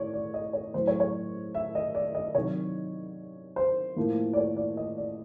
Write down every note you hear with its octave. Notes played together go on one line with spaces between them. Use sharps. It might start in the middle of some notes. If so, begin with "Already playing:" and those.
Already playing: A2 C#5 D5
D5
D#5
C#5
A2 F#3 A3 C5
C#5
C#5
E5
D#5
D5
D#5
C3 D#3 F#3 C#5
C5
A2 F3 A#3
D5
C#5
D5
D#5
D5